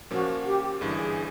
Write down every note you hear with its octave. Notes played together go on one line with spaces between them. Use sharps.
A#2 F3 A#3 C#4 F#4
G4
G1 G2 E3 G#4